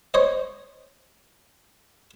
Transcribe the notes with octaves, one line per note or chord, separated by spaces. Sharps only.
C5 C#5 D#5